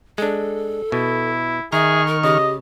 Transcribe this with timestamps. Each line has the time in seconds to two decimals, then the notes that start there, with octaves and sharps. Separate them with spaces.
0.18 G#3 D4 A4
0.92 B2 E4
1.72 D#3 G#4 E5 A#5 C#6 F6
2.07 A#4
2.23 C#3 G4 D#5